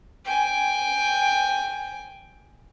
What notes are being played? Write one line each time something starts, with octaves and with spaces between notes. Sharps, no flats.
G5 G#5